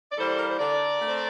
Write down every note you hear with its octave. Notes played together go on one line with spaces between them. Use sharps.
D5
E3 G3 A#3 A4 C5
A#4
C5
D3 A#4 D5
A3 C4